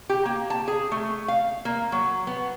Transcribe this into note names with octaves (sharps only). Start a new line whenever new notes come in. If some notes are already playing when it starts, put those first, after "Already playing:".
G4
A#3
A5
G#4
A3
F5
A#3
F#3
B3